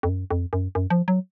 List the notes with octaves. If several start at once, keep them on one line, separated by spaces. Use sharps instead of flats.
F2
F#2
F2
F#2
F#2
F3
F#3